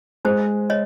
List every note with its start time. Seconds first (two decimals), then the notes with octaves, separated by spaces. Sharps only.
0.25 G#3 C5
0.70 C#5 D#5